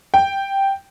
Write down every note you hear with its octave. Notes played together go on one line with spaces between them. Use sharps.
G5